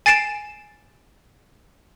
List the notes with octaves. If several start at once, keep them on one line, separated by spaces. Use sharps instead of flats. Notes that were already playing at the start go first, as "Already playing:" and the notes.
G#5 A6 C7 D7 E7